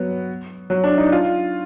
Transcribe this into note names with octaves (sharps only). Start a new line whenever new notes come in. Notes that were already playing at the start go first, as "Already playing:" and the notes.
Already playing: F#3 B3
F#3
D4
D#4
F4